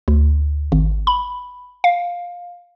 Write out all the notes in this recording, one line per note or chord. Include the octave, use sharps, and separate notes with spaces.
D2
G#1
B5
F5